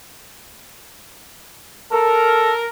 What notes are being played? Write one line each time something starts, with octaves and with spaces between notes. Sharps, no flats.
A4 A#4